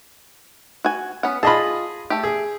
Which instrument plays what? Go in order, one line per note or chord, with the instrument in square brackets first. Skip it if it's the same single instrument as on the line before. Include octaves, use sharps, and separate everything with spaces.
[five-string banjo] F#4 G#5
B3 C#4 F#5
[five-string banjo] F4 A5 [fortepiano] G#4 D#5 B5
[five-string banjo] A3 G4
[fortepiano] G#4